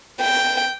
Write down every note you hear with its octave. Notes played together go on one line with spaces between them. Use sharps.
G5